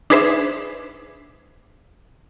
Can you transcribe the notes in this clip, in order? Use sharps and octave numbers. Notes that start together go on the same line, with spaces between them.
D4 D#4 G#4 B4 C5 E5